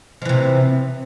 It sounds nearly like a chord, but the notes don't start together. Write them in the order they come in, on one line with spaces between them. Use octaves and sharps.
F3 E3 C3